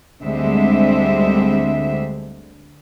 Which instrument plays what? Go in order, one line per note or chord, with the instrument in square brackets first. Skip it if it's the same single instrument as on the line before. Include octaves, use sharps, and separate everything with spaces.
[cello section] D2 D3 G3 G#3 C4 E5